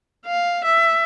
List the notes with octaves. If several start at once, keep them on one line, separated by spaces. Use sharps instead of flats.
F5
E5